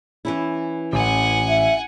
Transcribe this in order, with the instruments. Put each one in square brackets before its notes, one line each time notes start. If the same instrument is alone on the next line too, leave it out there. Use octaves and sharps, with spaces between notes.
[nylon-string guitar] E3 C#4 E4
[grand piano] A1 [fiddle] F#5 G#5
[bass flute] E5